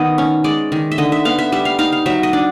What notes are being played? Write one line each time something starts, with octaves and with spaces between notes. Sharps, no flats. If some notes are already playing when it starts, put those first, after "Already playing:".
Already playing: D#3 B3 D#5
C#4
G#3 D5
D#3
E5
D3 D#5
E5
B3 F5
E5
G3 E5
F5
D#4 F5
F5
F#3 E5
D#5
D4